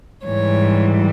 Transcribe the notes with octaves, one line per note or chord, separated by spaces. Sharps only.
G#2 E3 G3 C#5